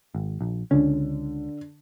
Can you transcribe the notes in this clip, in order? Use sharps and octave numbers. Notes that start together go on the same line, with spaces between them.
G#1
A#1
C#2 D3 C#4